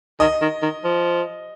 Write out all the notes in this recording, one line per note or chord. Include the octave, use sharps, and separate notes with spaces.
D#3 D#5
D#3
D#3
F3